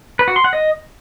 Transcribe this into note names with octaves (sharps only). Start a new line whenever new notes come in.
B4
F#4
C6
F#5
D#5